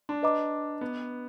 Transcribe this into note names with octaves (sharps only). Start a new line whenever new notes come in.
D4
B4 D#5 A#5 D6
B3